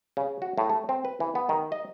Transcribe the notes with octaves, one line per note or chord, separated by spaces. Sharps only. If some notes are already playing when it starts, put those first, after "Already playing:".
C#3
F#4
A2
A3
C4
B4
E3
B3
D#3
D#5